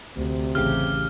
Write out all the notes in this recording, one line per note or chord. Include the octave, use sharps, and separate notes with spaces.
D2 C3
A1 C#3 G4 F6